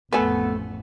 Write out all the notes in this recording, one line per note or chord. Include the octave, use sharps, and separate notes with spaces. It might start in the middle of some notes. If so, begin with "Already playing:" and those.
A1 F2 A3 B3 A4 B4 G#5